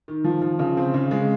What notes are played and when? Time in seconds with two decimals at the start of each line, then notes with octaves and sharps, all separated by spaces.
0.08 D#3
0.24 F3
0.42 F3
0.59 C#3
0.77 C4
0.94 C#3
1.11 G#3